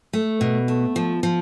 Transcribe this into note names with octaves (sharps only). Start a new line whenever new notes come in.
A3
B2
A3
F3
F3